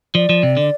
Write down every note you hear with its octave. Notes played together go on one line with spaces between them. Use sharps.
F3 D5
F3
C3
D3